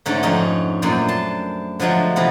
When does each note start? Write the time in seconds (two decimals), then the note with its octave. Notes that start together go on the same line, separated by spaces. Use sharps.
0.06 G#2 D3 A3 C#4
0.23 F2 G#2 C#4 D#4
0.82 F#2 A#2 A3 D4 C5
1.08 A5 C6
1.80 D3 F3 F#3 G#3 A3
2.16 C3 E3 F3 B3